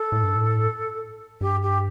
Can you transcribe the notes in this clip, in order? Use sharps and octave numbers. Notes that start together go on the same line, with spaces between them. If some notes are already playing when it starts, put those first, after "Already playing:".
Already playing: A4
A2
G2
A2
G2 G4
G4